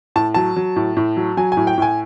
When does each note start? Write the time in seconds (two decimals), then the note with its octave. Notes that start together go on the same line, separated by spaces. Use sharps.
0.16 A2 A5
0.34 F#3 A5
0.56 F#3
0.76 A2
0.97 A2
1.17 F#3
1.37 F#3 G#5
1.52 G#5
1.57 A2
1.67 G5
1.78 A2 G#5